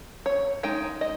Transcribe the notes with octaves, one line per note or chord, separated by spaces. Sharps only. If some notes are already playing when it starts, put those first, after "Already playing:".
C#5
G#3 D#4 G5
D#5